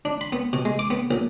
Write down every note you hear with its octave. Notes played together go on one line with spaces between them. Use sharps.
D4
B5
B3
B2
G#3
D6
B3
A#1